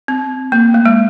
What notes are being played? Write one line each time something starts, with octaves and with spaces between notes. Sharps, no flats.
C4
A#3
A3
G#3